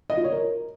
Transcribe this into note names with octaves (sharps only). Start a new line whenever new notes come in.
D#5
F4
C#5
A#4